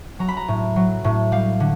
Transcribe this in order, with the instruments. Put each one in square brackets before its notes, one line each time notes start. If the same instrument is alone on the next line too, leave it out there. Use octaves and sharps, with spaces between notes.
[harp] F#3 A#5
B5
A#5
A2
F#3
A2
G3 F5
D3